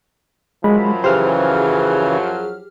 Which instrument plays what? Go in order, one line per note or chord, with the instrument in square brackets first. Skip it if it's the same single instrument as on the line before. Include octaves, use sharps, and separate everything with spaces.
[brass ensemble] F#2 F3 F#3 [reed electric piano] G#3 [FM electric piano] B5
[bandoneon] C#3 E3 [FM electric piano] G4 G#4 F6 [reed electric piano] C5